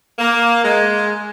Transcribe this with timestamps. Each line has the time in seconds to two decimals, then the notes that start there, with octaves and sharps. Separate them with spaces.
0.19 A#3
0.64 G#3